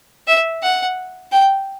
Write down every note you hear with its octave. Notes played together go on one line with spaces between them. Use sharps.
E5
F#5
G5